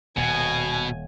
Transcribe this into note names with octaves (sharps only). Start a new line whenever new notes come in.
D#1 B2 G#5